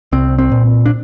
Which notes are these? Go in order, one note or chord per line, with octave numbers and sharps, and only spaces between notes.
C2 C4
C4
A#2
D4